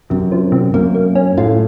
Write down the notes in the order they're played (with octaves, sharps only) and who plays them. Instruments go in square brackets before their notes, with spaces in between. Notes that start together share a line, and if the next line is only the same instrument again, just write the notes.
[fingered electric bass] F#2 [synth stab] C3
[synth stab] F3
C3
[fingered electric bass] F#2 [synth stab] A#3
[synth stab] A#3
C#4
[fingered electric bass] A2 [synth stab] F4